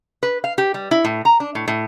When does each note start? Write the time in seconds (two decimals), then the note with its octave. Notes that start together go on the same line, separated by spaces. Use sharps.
0.23 B4
0.44 F5
0.58 G4
0.74 G3
0.91 E4
1.05 A2
1.25 A#5
1.40 D4
1.55 A2
1.68 A2